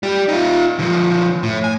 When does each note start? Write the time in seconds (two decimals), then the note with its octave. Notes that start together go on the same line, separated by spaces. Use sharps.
0.03 G3 G4
0.28 D#4 F4
0.79 D3 F3
1.43 A2
1.64 G#5